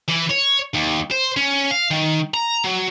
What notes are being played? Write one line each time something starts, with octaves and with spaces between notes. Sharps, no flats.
E3
C#5
D#2
C5
C#4
F5
D#3
A#5
F#3